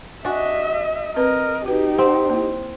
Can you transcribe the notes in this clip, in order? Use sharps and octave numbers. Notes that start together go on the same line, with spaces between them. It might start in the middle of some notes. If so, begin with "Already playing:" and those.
D4 F#4 D#5 E5 G#5
C4 A#4 B4 D#5
D#4 F#4 G4 B4
C4 F#5
A#3 E4